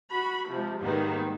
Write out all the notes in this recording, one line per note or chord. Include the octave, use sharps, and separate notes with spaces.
F#4 B5
C3 F3 G#3
G#2 D#3 G3 G#3 A#3 B3